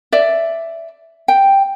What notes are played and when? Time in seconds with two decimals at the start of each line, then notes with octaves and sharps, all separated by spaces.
0.12 D5 E5
1.28 G5